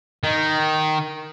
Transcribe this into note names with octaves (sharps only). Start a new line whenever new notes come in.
D#3